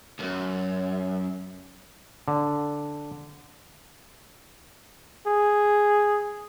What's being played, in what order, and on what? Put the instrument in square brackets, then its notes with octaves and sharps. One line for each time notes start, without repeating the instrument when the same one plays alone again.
[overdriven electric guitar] C#2 F#2
[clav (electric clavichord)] D3
[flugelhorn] G#4